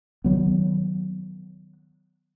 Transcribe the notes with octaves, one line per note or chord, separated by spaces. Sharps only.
D#3 F3 F#3 B3